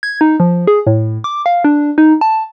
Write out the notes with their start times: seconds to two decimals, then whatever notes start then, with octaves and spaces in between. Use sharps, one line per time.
0.03 G#6
0.21 D#4
0.40 F3
0.67 G#4
0.87 A2
1.24 D6
1.46 F5
1.64 D4
1.98 D#4
2.21 A5